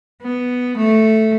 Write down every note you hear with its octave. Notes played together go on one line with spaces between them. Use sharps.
B3
A3